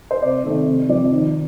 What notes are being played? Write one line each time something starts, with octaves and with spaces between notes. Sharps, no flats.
C5
C3 D5
D#3 A3 C4
C3
F3 C4 D5
D#3